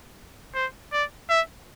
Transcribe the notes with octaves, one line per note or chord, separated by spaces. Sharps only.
C5
D5
E5